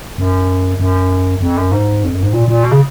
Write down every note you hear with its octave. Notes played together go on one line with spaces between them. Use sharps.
F#2
F#2
F2
F#2
G#2
F2
F#2
G#2
A#2
A#2
B2
C#3